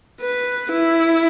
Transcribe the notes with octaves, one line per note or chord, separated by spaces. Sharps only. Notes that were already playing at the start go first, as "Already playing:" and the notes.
B4
E4